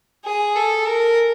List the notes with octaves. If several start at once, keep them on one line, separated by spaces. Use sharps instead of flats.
G#4
A4
A#4